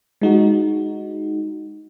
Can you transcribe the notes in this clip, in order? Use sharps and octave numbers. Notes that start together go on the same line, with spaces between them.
G#3 D#4 F#4